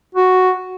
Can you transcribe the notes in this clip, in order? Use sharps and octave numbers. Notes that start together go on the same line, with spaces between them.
F#4